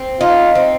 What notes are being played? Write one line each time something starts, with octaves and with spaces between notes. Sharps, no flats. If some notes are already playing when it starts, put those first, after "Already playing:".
Already playing: C4
D#4 F4
C4